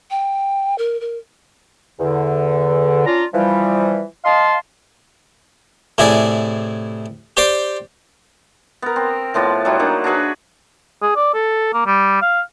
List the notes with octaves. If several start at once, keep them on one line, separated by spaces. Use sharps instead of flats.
G5
A#4
A#4
E2 D3
C#4 D4 F4 A#5
E3 F3 G3
D#5 F5 A5 C6
A2 C3 E4 G#4 D5
G4 C5 D5 C6 D6
B3 A#4
C4
A2 F3 B3 D5
F#3 G3 E4
A#3 D4 D#4 F#5
D4 F#4 G#4 B4
G#4
D5
A4
A#3
G3
F5